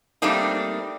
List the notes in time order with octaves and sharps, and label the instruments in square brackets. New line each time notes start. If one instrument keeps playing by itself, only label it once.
[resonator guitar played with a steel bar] G3 A3 A#3 C4 D4 D#4